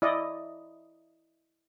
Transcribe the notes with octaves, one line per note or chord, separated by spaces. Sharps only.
E4 D5 D#5